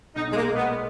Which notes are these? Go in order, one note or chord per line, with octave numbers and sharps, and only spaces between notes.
B1 D#4
G#3
A#3
A#2 G#3
B3